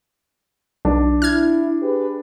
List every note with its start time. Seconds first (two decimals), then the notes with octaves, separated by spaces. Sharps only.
0.85 B1 D4
1.22 E4 F6 G#6
1.80 G4 G#4 B4